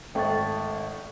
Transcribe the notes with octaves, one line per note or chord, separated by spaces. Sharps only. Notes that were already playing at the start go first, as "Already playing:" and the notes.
G#1 A3 G5 C#6 A6